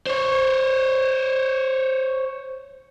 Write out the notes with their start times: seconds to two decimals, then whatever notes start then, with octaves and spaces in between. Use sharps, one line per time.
0.06 C5 C#5